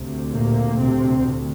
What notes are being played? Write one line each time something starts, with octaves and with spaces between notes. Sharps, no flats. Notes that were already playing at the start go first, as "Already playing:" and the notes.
Already playing: D2 C3
A#2 A#3
C3 C4